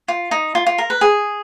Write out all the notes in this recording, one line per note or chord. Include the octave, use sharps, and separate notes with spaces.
F4
D#4
F4
F4
A#4
B4
G#4